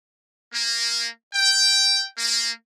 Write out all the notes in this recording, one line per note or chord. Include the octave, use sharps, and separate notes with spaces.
A#3
G5
A#3